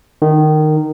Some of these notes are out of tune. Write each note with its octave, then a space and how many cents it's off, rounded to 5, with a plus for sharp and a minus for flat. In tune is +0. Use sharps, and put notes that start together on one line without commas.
D#3 -15